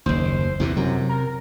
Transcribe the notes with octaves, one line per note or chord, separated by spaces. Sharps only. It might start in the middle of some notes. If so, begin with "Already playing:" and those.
F#1 D#2 C5
E2 C3 E3
F#2 C3
A#4